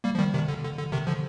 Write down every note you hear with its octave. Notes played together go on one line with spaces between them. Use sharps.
G3 A#3
F3
D#3 G3
C3 D#3
D3
D3
D3
C3 D#3
D3 F3